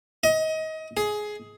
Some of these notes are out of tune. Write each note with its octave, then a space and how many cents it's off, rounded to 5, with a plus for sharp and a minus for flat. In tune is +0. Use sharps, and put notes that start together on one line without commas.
D#5 +25
G#4 +15